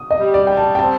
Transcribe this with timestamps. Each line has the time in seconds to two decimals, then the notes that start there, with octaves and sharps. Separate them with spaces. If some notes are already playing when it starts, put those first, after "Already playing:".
Already playing: D#6
0.11 D#5
0.19 G3
0.34 D5
0.47 G3 G5
0.57 A5
0.75 G5
0.79 C4 A5